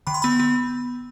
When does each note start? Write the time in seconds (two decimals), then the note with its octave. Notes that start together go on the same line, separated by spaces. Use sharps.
0.07 D3 B5
0.14 C6
0.22 B3 B5
0.39 B3